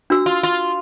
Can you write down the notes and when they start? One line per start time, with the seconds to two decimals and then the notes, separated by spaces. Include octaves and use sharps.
0.10 D4 F#4 E6
0.26 F4
0.43 F4